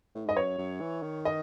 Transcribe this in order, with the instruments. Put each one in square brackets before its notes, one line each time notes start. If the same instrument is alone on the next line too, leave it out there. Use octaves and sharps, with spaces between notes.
[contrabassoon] A2
[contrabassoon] G#2 [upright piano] D#5
[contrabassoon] F#2 [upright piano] C#5
[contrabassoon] F#2
E3
D#3
[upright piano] D#5